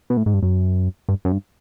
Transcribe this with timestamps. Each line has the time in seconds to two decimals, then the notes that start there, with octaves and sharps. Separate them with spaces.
0.10 B2
0.17 A2
0.26 G#2
0.34 G2
0.43 F#2
1.09 G2
1.25 F#2
1.32 G2